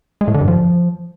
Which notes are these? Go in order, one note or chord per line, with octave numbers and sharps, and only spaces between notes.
G#3
A2
D3
G2
F3